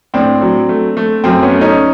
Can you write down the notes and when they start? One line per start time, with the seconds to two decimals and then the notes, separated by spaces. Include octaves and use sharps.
0.14 A2 C4 D4
0.41 F#3
0.69 A3
0.97 A3
1.24 F#2 C4
1.42 B3 C#4
1.52 A3
1.61 C#4 D#4